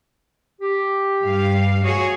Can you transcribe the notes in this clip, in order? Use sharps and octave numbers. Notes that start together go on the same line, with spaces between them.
G4
G2 F5
F#4 G#4 C#5